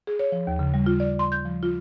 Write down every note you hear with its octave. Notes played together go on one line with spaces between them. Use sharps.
G#4
C#5
F3
D#2
C#3
G3
F4
D5
C6
G6
F3
F4